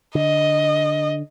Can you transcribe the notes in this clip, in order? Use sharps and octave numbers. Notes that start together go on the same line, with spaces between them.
D3 D#5